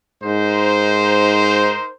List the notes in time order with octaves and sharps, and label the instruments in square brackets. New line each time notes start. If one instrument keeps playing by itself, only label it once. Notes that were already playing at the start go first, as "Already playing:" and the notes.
[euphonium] G#2 [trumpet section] D#4 A#4 C5